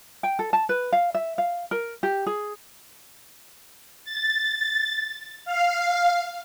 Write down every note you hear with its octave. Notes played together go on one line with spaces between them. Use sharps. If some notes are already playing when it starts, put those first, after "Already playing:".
G5
A4
A5
B4
F5
E5
F5
A#4
G4
G#4
A6
F5